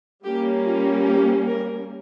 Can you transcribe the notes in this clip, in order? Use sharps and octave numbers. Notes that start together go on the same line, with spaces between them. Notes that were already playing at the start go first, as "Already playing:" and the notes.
G3 A#3 C#4 G4
F4
G4
A#4